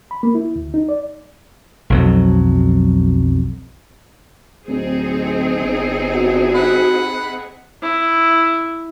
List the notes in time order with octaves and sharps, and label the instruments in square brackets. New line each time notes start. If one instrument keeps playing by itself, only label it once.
[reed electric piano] B5
A#3
E4
D2
D#4
D5
[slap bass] B1 F2 F#3
[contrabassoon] D1 [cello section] C4 D#4 G#4
[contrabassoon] G1
[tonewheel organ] F#4
[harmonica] F#5 B5
[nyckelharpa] E4